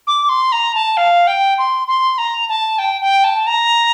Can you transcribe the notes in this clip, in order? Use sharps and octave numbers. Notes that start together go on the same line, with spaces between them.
D6
C6
A#5
A5
F5
G5
C6
C6
A#5
A5
G5
G5
A5
A#5